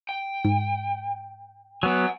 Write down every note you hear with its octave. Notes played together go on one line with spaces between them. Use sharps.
G5
G#2
F#3 B3 F#5 G#5